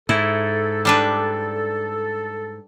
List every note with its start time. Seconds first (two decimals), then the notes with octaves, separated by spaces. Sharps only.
0.09 G#2 E4 A4
0.85 G3 D4 B4